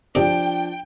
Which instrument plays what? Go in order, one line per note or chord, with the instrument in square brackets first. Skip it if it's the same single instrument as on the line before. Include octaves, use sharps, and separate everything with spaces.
[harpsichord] G#2 C3 [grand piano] F3 D4 [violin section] G5